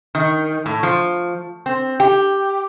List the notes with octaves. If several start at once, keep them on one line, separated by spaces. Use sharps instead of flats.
D#3
A2
F3
C4
G4